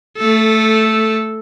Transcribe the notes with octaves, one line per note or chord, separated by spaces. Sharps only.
A3 A4